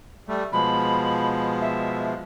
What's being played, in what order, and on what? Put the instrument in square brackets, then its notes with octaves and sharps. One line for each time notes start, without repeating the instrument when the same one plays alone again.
[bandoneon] G3 A3
[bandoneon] B2 F3 G#3 [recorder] B5
[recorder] E5